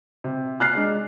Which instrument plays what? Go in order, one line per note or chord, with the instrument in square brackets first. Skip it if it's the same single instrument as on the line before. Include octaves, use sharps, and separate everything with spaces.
[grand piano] C3
[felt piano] F6 F#6 C7
[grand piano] G#3 D4